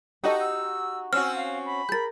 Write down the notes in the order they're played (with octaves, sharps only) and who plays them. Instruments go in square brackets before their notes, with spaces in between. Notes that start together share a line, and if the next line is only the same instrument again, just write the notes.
[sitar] D#4 F#4 [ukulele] G4 D#5 [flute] A4
[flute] E6
[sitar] C4 C#4 F#4 [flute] E6 [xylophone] F6
[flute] F5
B5
[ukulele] G#4 A#4 [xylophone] G6 A6